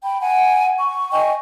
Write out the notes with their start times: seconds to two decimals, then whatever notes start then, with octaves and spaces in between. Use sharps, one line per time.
0.05 G5 B5
0.21 F#5 G#5
0.79 C#6
1.12 D#5 G5 G#5 C#6